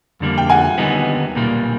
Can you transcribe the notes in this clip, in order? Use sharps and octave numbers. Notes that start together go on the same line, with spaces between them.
F2 D3 G3 A#3
G5
F#5 G#5
D#2 D3 G3 B3 D#4
B1 A#2 G3 A#3